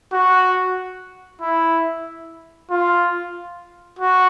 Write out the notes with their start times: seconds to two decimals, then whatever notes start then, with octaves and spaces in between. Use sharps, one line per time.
0.13 F#4
1.41 E4
2.70 F4
3.99 F#4